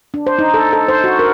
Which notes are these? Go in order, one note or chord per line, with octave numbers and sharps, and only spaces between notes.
D4
C5
D#4
A4
A4
C5
F#4
A#4